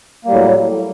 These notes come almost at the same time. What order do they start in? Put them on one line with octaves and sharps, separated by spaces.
A#3 G3 A2 F#3